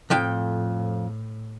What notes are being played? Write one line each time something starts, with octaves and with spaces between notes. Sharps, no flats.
F2 A2 F3 G5